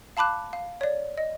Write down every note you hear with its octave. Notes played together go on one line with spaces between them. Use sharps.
F5 A5 B5 D6 F#6
F5
C#5 D5
D#5